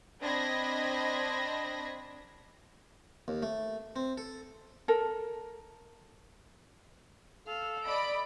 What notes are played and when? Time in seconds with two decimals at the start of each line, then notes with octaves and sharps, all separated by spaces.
0.21 C4 D4 D#5 B5 G#6 A#6
3.28 D#2
3.43 A3
3.96 C4
4.18 A4
4.88 A4 A#4
7.47 A4 F5
7.87 D5 D#5 B5 D7